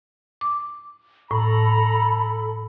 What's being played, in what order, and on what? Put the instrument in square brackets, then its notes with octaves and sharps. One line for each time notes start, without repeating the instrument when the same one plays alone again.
[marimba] D6
[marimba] A2 [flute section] A4 B5 [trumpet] A#5